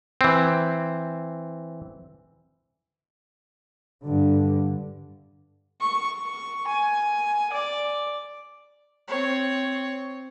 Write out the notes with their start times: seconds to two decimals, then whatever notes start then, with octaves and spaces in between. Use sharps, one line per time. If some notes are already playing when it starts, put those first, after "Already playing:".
0.21 E3 C4
4.04 G2 D3
5.81 C#6
6.20 C#6
6.67 G#5
7.53 D5
9.08 C4 C#5